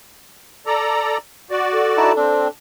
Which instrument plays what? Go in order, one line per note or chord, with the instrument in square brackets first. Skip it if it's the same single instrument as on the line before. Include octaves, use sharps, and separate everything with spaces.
[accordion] A4 D5 A#5
F#4 D5
[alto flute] A4
[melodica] D#4 E4 A5
[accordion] C4 [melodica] D4